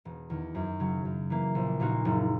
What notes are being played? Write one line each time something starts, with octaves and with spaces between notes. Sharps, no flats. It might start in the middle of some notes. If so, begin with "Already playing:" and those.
E1
E2 D#3
F#2
C#3 F#3
F#2
E3 A#3
A#1
A#2 A#3 D#4 F#4
F#1